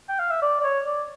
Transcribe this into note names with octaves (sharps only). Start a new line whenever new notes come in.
G5
F5
E5
D5
D5
C#5
D5